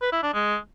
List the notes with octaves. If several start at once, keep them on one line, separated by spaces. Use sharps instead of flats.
B4
E4
D4
G#3